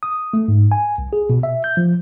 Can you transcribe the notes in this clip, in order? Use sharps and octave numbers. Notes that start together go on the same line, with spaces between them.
D#6
A3
G#2
G#5
C2
G#4
B2
E5
G6
F3